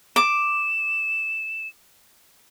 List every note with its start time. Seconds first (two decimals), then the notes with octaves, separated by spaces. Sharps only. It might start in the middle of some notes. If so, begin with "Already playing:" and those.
0.16 D6 E7